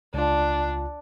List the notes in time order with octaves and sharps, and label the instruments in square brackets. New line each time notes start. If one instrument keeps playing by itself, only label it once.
[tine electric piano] C#2 F4 [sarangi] D4